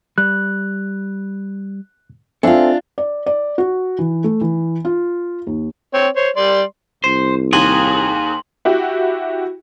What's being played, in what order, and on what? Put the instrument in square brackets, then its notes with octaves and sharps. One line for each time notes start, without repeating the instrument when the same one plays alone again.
[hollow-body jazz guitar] G3 [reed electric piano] F#6
[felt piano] C4 E5 G#5 [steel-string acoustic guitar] D4 F4 [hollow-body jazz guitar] A4 F5
[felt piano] D5
D5
F#4
E3
A3
E3
F4
D#2
[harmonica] C4 C#5
C5 C#5
G3 D5 C6
[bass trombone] C2 [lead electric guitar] C5
[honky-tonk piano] D#2 [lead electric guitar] G#4 [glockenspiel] C6 F#7
[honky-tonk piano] E4 F#4 G4